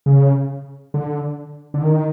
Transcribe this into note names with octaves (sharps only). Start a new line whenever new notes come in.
C#3
D3
D3
D#3